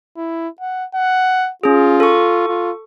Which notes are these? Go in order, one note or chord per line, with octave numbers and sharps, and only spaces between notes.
E4
F#5
F#5
C#4 F4 G#4
A4 C#6
F4